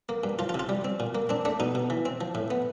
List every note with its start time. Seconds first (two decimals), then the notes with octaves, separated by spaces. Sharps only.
0.09 A#3
0.24 G2
0.39 F3 F4
0.49 F4
0.54 C3
0.59 F4
0.69 G3
0.85 C4
1.00 A#2
1.15 A#3
1.29 C4 D4
1.45 A3 D4
1.60 B2 D#4
1.75 B2
1.90 E3
2.05 C4
2.21 F3
2.35 A2
2.51 B3